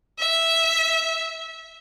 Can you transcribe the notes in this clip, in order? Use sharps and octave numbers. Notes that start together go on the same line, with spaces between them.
E5